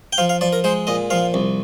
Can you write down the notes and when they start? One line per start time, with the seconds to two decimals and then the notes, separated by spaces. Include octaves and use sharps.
0.13 G5
0.18 F3 F5
0.29 F5
0.41 F3 D5
0.53 A#4
0.64 G#3 C5
0.87 A#2 D#5
1.10 F3 F5
1.34 C2